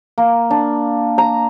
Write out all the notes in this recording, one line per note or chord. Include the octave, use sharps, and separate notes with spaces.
A#3
D4
A#5